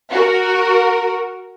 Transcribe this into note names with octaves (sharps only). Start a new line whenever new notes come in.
F#4 A#4